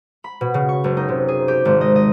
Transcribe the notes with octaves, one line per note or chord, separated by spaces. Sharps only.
B5
B2
C#3
C#6
F#1
D#4
C3
G#4
G4
G#1
D#5
D#5